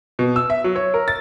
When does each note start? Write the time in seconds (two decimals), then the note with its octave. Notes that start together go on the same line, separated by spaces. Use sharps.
0.19 B2
0.36 E6
0.50 E5
0.64 F#3
0.76 C#5
0.94 A#4
1.08 A6